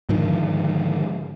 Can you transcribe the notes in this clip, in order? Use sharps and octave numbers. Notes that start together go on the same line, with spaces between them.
G#2 D3 D#3 F3